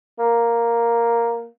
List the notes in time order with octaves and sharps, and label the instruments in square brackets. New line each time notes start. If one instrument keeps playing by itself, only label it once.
[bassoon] A#3